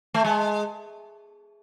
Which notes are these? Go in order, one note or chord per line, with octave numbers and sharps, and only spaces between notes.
A3
G#3